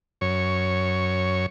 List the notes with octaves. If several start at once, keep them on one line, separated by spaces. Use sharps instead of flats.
F#2 C#5